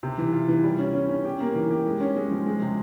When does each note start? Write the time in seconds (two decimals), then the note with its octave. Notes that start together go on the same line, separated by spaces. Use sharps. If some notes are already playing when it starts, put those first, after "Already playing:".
0.03 C3
0.18 E3
0.33 F4
0.48 E3
0.64 G3
0.79 C#4
0.94 C#4
1.09 C#4
1.25 G4
1.40 A#3
1.55 E3
1.71 G4
1.86 G#3
2.00 C#4
2.16 G#3
2.31 F3
2.46 G#3
2.62 C3